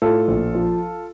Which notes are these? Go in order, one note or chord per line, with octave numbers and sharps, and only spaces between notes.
A2 F4 A4
A#1
F3